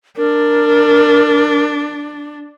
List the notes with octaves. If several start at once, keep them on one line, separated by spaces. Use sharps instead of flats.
D4 A#4